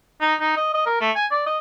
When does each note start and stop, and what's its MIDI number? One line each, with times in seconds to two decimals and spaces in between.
0.21 0.35 63
0.40 0.54 63
0.57 0.71 75
0.74 0.83 75
0.86 1.01 70
1.01 1.11 57
1.16 1.26 80
1.31 1.43 74
1.46 1.59 75